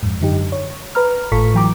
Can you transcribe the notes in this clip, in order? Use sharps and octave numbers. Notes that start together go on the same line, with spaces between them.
F2 G#2
F#2 D3 D#4 G4
C#5
B4 A#5 F6
G#1 A2 F4 A4 C#6 B6
E3 F#3 G5 A#5 D6